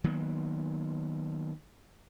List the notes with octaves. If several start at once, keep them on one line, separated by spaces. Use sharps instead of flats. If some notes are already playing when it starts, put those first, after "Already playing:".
D#3 F#3 A#3 B3